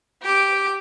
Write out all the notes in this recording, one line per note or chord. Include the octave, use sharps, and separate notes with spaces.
G4 D6